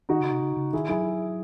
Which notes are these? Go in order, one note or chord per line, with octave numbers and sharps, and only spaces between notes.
D#3 D#4 F#4
C#3
C3
C#3
C#3
D#3 E4 G#4
F#3 E4 G#4